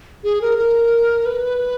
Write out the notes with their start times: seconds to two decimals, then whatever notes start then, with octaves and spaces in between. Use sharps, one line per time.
0.24 G#4
0.42 A#4
0.58 A#4
1.26 B4